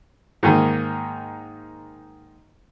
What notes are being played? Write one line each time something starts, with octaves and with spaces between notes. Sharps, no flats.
G#2 D#3 A#3